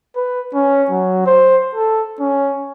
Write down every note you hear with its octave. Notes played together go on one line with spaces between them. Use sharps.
B4
C#4
F#3
C5
A4
C#4